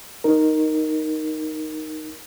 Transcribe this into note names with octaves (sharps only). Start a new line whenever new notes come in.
D#4 A#4